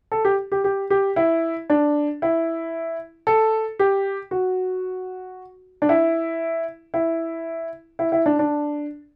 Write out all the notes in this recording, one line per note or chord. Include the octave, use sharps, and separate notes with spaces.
A4
G4
G4
G4
G4
E4
D4
E4
A4
G4
F#4
D4
E4
E4
E4
E4
D4
D4